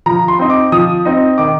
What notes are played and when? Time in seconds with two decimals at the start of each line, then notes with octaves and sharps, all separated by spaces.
0.06 F3 A#5
0.28 C6
0.39 C4 D#4
0.50 D6
0.72 F3 D#6
1.05 C4 D#4
1.38 D#3 D6